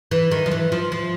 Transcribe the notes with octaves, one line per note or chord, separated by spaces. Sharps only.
E3
D#3
F3
E3
F3
F3